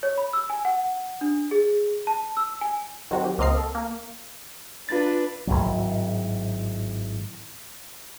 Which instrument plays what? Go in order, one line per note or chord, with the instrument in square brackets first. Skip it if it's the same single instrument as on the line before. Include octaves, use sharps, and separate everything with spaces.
[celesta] C#5
B5
E6
G#5
F#5
D4
G#4
A5
E6
G#5
[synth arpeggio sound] D#3 F#3 C4 F#4
G4
C#2 A#3 C4 D#5 F5 C7
A4
A#3
[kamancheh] D4 B4 [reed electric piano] F4 A6
[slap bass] G#1 C#2 A2 F#3